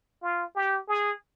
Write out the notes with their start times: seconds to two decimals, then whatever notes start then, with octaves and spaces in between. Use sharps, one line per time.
0.22 F4
0.55 G4
0.88 G#4